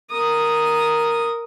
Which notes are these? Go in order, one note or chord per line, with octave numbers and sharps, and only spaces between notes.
A#4 D#6